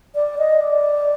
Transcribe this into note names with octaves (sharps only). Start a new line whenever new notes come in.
D5
D#5
D5